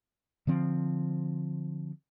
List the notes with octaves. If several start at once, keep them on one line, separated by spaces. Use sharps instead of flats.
D3 F3 C4